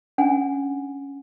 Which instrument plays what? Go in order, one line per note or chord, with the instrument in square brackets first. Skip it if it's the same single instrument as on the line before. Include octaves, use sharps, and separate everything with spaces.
[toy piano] C#4 D4 F#5 G#5